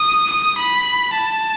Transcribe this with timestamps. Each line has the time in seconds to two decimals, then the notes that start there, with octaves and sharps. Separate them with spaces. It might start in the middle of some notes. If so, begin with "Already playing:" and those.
Already playing: D#6
0.30 D#6
0.58 B5
1.14 A5